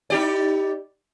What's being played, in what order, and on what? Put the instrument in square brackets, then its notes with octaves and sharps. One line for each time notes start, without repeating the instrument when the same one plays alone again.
[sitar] D#4 G4 D5